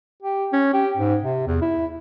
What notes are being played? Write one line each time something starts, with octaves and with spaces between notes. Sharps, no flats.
G4
C#4
G4
G#2
C3
E2
E4